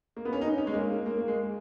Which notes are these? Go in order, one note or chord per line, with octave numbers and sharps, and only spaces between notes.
A#3
B3
C#4
D#4
C#4
G#3
A#3
A#3
A#3
A#3
G#3